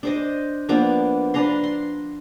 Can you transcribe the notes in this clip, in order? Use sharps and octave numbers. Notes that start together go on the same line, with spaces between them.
D4 C5 D#5
F3 A#3 B3 D4
D4 B4 A#5 C6
C6